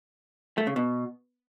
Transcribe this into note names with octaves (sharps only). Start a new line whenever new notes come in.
A3
C#3
B2